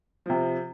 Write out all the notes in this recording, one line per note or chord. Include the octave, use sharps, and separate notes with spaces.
C3 F3